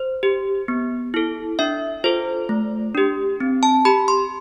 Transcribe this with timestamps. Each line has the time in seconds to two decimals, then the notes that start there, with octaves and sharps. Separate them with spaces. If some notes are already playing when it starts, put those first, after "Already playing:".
Already playing: C5
0.23 G4
0.68 B3
1.14 E4 A4
1.59 D4 E5
2.04 F4 A4 C5
2.49 A3
2.95 D4 G4
3.40 C4
3.63 A5
3.85 G4 B5
4.08 C6